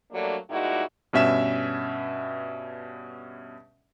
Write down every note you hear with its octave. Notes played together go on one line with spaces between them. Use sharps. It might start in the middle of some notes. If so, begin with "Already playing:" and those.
F#3 G3 A3 A#3 D4
A#2 G3 G#3 D#4 E4 F#4
G2 B2 C#4 E5 B6 E7